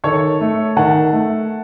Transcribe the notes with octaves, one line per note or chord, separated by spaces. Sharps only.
D#3 A4 C#5
A3
D#3 F#5 A5
A3